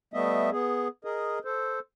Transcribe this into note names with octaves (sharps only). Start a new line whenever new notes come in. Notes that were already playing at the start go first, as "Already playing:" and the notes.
G3 A3 B3 D#5 E5
B3 G#4
G#4 A#4 D#5
A4 C5